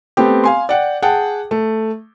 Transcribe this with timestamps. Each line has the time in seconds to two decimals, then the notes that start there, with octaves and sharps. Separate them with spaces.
0.17 A3 B3 C4 G4
0.44 F5 G#5 C6
0.69 D5 F#5 G5
1.02 G#4 F#5 G5 A5
1.51 A3